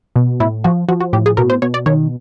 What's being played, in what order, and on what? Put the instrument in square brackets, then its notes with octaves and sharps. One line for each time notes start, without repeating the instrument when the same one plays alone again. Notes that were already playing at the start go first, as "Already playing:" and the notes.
[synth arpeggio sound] B2
A2 E4
F3 F#4
F3 F#4
F#4
A2 G4
G#4
B2 A#4
C5
B2 C#5
D5
D#3 C#5